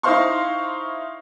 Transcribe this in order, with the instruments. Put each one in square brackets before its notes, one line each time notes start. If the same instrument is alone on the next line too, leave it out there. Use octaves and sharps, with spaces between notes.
[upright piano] D#4 E4 C5 F5 C6 C#6